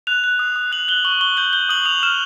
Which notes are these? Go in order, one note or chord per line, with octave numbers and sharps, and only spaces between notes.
F#6 F7
F#6
D#6
D#6
F#6 F#7
F#6 G7
C#6 F#7
C#6 G7
G6 F#7
G6 G7
D#6 F#7
D#6 F7
F6 E7